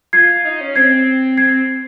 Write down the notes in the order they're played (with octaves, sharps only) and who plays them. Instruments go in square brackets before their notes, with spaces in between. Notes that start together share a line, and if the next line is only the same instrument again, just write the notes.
[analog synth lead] F4 [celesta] G#6 C7
[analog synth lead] D#4
C#4
[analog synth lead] C4 [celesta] G#6 C7
[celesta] G#6 C7